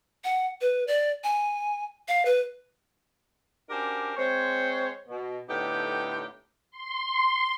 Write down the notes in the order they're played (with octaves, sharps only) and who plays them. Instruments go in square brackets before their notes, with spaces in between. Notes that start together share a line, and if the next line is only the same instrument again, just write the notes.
[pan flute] F#5
B4
D5
G#5
F5
B4
[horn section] C#4 D4 F#4 G4 A#4 C5
G#3 C4 C5 C#5
B2
A2 D3 B3 D#4 G4 G5
[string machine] C6